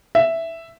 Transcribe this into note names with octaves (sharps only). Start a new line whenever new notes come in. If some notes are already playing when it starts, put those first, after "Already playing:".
E5